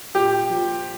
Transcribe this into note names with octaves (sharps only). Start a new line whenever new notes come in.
A#2 G4
F3